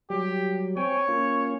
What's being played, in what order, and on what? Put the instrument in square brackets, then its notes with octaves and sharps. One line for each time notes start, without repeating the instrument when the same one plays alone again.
[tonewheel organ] F#3 G3 [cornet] G4
[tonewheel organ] C4 G5 G#5 [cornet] C#5
[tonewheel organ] A#3 C#4 F4